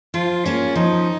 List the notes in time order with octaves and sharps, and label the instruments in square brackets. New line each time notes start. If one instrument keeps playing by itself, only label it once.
[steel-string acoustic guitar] F3 [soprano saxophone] F4
[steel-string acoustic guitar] A#3 F4 G#4 [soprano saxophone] C#4
[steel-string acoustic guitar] F3 [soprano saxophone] D#4